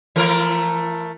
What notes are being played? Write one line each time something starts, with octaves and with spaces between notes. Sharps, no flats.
E3 A3 A#4